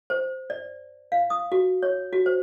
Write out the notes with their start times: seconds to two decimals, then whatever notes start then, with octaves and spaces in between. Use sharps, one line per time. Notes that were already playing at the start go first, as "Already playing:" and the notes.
0.10 C5
0.50 D5
1.12 F5
1.30 D#6
1.52 F#4
1.83 C#5
2.13 F#4
2.26 C5